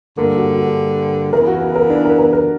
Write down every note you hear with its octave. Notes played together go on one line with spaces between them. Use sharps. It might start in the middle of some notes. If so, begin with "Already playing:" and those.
G2 D3 G3 A#3
F#4
F#4
C#3 E3 B3 E4 A#4
F#4
F#4
A#4
D4
A#4
A#4
A#4